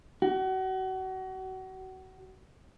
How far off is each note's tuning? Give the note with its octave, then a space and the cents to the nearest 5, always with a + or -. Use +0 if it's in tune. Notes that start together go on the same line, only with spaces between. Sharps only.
F#4 +30